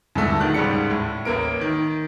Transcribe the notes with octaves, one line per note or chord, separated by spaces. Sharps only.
G2 A#2 D3 A3
E1 D#3 F#6
C#2 G#2 G3 C#7
A2
A1 A#3 A#4 D7
D#3